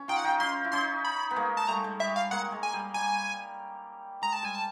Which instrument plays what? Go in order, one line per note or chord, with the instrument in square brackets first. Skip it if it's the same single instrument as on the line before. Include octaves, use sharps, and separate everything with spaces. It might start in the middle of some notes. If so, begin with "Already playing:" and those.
Already playing: [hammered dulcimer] C#4
[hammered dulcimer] D#4 F4 [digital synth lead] G5
[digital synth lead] F#5
[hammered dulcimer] D#4 F4 [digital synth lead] G5
[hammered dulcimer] C#4 D#4 [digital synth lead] C6
[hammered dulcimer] E4
[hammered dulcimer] C#4 D#4 [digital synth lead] C6
[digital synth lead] B5
[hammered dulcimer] B3
G#3 A#3
[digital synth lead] A5
[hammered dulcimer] G3 A3 [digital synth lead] A#5
[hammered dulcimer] G#3
[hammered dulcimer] G3 [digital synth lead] E5
[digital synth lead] F5
[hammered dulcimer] G#3 A#3 [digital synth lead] F#5
[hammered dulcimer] G#3
[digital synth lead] G#5
[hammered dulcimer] G3
[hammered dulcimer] G3 [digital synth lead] G#5
[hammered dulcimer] G#3 [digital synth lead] A#5
[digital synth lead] A5
[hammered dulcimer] G3 [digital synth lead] G#5
[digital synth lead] A5